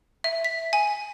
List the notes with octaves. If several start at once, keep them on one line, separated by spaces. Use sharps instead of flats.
E5
B6
G#5